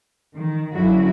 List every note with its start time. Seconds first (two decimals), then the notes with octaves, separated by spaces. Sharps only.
0.35 D#3
0.73 F#2 D3 F#3 E4 F#4